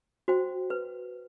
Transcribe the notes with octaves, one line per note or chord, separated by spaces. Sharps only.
F#4 C5 G5
B4